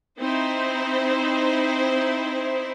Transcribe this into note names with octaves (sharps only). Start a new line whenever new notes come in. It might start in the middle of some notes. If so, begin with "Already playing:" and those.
C4 D#4 E4 C5